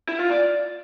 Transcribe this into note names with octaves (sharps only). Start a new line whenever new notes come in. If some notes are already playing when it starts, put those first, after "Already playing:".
E4
F4
D5